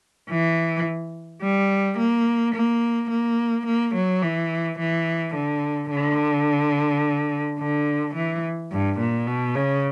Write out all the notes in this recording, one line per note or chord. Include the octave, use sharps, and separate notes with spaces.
E3
G3
A#3
A#3
A#3
A#3
F#3
E3
E3
D3
D3
D3
E3
G2
A#2
B2
C#3